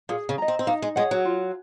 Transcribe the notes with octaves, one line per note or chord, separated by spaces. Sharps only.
A#2 G#4
C#3
D#5 A#5
C4
C4
A#3 D#4
G#3
G#3 G#4 C#5 F#5
F#3
F4